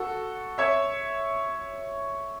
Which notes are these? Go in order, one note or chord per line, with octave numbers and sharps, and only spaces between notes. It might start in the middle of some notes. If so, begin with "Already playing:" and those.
Already playing: F#4 A4
C#5 E5